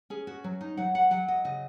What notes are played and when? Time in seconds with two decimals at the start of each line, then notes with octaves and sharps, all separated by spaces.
0.10 C#4 G#4
0.27 F#4
0.44 F#3
0.61 D#4
0.77 F#3 F#5
0.95 F#5
1.11 F#3 F#5
1.28 D#5
1.45 C#3 D#5